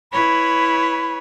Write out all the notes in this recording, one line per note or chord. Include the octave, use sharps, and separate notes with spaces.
E4 B4 C#5 B5